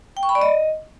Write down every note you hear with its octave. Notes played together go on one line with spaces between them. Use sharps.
G5
C#6
B5
D5
D#5